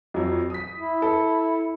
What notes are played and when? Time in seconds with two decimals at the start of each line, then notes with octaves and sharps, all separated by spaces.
0.14 F2 F#3
0.50 D#6 B6
0.75 E4
1.02 A4